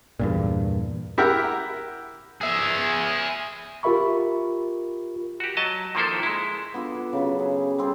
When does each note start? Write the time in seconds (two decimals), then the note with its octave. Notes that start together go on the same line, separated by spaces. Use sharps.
0.19 E2 G2 A#2
1.18 E4 G4 A#4 F#5
2.41 G#4 E5
3.83 F4 G4 A#4 E5 B5 C#6
5.40 F#4 G4
5.57 F#3 D#5 A5
5.95 D#3 F3 A#3 E4 A4 C5
6.23 G#3 E4
6.74 B3 D4 F4 A4
6.95 B4
7.13 C#3 F#3 B4
7.39 G#4
7.56 G4
7.78 G3 C4 G#4 A4